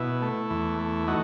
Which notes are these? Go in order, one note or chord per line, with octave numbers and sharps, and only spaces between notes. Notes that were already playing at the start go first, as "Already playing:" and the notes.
Already playing: B2 E4
A3
E2
A3
A3 D#4 F#4